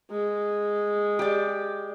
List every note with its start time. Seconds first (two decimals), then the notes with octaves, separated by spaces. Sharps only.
0.11 G#3
1.19 G4 D5